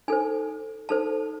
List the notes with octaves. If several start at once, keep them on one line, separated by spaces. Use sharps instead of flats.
D#4 A4 C5 G#5
D#4 A4 C5 A5